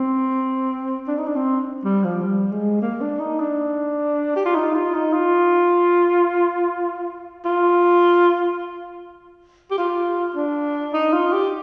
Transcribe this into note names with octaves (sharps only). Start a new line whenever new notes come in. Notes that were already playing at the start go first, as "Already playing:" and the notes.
Already playing: C4
D4
D#4
D4
C4
G3
F3
G3
G#3
A#3
D4
D#4
D4
G4
F4
D#4
F4
D#4
F4
F4
G4
F4
D4
D#4
F4
G4